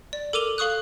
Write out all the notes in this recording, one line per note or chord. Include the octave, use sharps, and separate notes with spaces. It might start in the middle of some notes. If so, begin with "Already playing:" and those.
D5
A4 A#4 D6 D#7 F7 G7
A4 F5 C#6 D#6 F#6